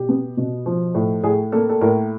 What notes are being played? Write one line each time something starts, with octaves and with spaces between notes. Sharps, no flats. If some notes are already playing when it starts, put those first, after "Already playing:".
Already playing: B2 G4
B3
B2
F3
A2
A2 G#4
A#3 A4
A4
A2 A#4